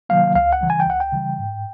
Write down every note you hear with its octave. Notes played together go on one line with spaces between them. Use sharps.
C3 D#3 F#3 A#3 F5
C#2 F5
F#5
C#3 E3 G3
G#5
G5
C#2 F#5
G5
C#3 E3 G3
G#2